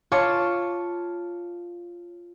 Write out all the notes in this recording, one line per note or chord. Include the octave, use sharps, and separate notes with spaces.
F4 C#5 A5 C#6 D6